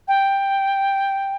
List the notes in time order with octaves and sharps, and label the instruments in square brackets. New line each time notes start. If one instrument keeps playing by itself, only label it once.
[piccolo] G5